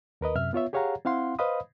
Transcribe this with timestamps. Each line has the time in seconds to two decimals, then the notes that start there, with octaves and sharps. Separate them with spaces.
0.21 D#2 A#4 B4 D#5
0.35 F#2 C3 E5 F6
0.53 B3 F4 C#5 E5
0.73 G4 G#4 C#5 F5 F#5 A#5
1.05 C4 E4 F5 F#5 C6
1.39 B4 C5 D#5 F5 B5 D#6